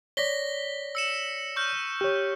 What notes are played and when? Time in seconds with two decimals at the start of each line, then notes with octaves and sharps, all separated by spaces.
0.17 C#5 D5 A#6 B6 G7
0.95 E6 C#7 E7
1.56 C#6 F6 G6
2.01 G4 C#5